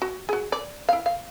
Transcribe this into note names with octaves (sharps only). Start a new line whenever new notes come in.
F#4
F#4 G#4
D5
E4 F5
F5